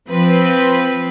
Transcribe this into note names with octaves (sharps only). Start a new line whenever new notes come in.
F3 C4 B4